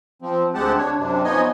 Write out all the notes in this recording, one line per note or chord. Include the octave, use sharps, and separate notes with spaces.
F3 C4
D2 G#3 C4 G4 F#5 A5
D4 C#5
F#2 C3 D4
F3 B3 D#4 C#5 D#5 G#5